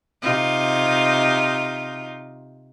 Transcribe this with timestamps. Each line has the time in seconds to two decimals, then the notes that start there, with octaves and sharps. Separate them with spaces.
0.22 C3 D#4 F4